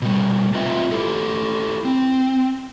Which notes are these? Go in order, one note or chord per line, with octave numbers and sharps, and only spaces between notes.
B2 G3
C4 F4 B4 D#5 E5
E4 G4 A4
C4